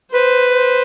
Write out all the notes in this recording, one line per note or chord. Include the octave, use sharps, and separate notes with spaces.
B4 C5
C5